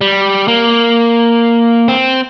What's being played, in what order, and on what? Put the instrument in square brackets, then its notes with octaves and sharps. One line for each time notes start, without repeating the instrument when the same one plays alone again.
[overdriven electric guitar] G3
A#3
C4